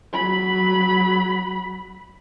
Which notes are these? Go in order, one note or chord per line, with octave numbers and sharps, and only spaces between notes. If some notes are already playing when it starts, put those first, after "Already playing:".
F#3 B5